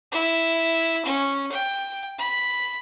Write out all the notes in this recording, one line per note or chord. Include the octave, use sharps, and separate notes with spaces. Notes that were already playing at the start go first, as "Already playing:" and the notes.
E4
C#4
G5
B5